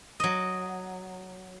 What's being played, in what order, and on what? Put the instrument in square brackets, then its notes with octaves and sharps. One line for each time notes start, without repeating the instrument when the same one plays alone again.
[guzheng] F#3 D#5